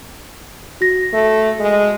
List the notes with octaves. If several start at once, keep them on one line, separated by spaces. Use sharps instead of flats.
F#4 A#6
A3
G#3